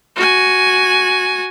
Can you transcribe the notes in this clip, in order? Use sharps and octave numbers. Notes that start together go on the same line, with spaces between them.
F#4 G#5